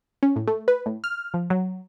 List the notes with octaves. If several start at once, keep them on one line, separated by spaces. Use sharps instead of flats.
C#4
A2
A3
B4
A2
F6
F3
F#3